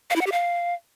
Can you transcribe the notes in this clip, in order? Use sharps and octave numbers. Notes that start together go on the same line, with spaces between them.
F5
E4
F#5
G4
F5